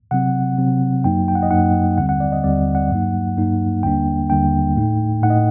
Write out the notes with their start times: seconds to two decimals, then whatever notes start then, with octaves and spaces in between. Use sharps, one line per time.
0.11 C3 F#3 C4 F#5
0.58 C3 F#3 C4
1.04 F#2 F#3 A#3 D#4 G5
1.28 G5
1.35 F#5
1.43 D#5
1.51 F#2 F#3 A#3 D#4 F#5
1.97 D#2 D3 G3 C4 F#5
2.09 F#5
2.20 D5
2.32 D#5
2.44 D#2 D3 G3 C4 D5
2.75 F#5
2.91 G2 F#3 A#3 D#4
3.37 G2 F#3 A#3 D#4
3.83 D#2 D3 G3 A#3 D4 G5
4.30 D#2 D3 G3 A#3 D4 G5
4.76 A2 A3 D#4
5.23 A2 A3 D#4 F#5
5.30 D#5